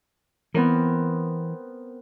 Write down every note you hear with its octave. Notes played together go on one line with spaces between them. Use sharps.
E3 B3 C4 A#4